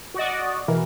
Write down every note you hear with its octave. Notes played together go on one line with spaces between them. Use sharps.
F#4 D5 D#5
B2 E3 A#4